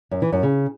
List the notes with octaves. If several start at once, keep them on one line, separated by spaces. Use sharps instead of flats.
F#2
E3
F#2
C#3